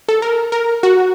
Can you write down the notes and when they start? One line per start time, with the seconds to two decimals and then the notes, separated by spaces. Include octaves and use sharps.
0.09 A4
0.22 A#4
0.52 A#4
0.83 F#4